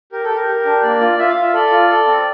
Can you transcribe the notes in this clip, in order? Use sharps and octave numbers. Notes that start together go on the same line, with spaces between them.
G4 A#4
A4
G4
A#4
G4
D4
A#3 D5
F4
F4 E5
F5
F4
E5
A4 D5
F4
A4
C4